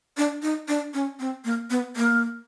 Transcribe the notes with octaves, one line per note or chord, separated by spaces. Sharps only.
D4
D#4
D4
C#4
C4
A#3
B3
A#3